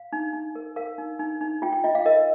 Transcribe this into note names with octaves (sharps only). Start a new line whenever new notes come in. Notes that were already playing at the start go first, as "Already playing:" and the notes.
Already playing: F5
D#4
D#4
A#4
A#4 F5
D#4
D#4
D#4
F4 G5
G5
F4 D#5
F5
A#4 D#5